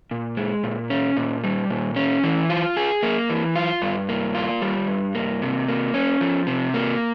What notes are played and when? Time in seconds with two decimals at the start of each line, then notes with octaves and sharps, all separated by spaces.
0.11 A#2
0.37 G#3
0.63 A#2
0.90 C#4
1.17 A#2
1.44 G3
1.70 A#2
1.96 C#4
2.23 E3
2.50 F4
2.77 G#4
3.03 A#3
3.30 E3
3.56 F4
3.82 G2
4.09 A#3
4.35 F4
4.62 G3
4.88 G2
5.15 A#3
5.42 C3
5.68 A#3
5.94 C#4
6.21 F3
6.47 C3
6.74 A#3